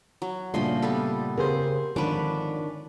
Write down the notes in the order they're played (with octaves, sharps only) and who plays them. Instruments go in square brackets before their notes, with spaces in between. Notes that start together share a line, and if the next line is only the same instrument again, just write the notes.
[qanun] F#3
[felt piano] G2 A#2 C#3 [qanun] F3 D#5 C6 [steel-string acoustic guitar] A3
[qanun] G3 B3 A4
[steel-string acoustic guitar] C#3 G#4 C5 [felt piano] C4 G4 A#4
[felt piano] G#1 D3 F3 [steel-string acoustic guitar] D#3 C#4 D4 [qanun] B4 D6